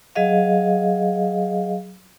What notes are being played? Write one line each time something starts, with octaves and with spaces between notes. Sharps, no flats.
F#3 G#4 D#5 F5